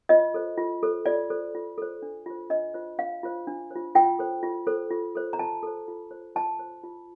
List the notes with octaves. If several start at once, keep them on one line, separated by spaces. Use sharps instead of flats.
F4 D#5
A4 C5
F4
A4 C5
F4 D5
A4 C5
F4
A4 C5
D4
F4 C5
D4 D#5
F4 C5
D4 F5
F4 C5
D4
C5
F4
F4 G5
A4 C5
F4
A4 C5
F4
A4 C5
A#5
F4 A5
A4 C5
F4
C5
F4 A5
C5
F4